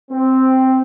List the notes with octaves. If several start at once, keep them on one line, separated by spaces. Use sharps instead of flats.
C4